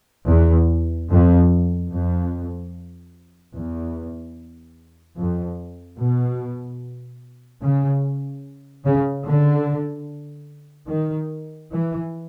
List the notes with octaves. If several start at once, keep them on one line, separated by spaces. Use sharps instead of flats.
E2
F2
F2
E2
F2
B2
C#3
C#3
D3
D#3
E3